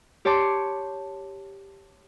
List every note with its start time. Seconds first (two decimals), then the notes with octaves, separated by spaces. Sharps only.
0.25 G4 C#5 A5 C6 D6